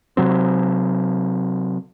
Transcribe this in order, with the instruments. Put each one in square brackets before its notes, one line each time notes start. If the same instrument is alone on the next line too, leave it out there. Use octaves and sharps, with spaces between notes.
[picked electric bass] C3 F#3 C4